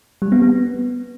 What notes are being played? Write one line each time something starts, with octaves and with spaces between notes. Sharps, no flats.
G3
B3
B3